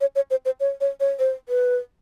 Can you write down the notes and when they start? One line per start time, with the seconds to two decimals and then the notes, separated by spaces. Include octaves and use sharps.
0.01 C#5
0.16 C#5
0.31 C5
0.45 C5
0.60 C#5
0.81 C#5
1.00 C#5
1.19 C5
1.49 B4